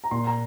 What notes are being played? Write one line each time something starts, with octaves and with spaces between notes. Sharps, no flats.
A#5
A#2 C6
A#5